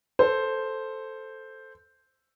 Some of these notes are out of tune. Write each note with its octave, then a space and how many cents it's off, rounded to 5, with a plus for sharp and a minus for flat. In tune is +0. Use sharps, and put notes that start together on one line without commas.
A4 +0 C5 +0